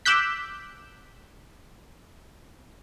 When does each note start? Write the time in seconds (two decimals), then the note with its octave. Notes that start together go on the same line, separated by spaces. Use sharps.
0.06 D6 E6 F#6 G6 B6